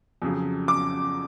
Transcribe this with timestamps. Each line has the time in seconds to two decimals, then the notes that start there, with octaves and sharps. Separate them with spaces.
0.22 F2 C#3 F#3
0.68 D6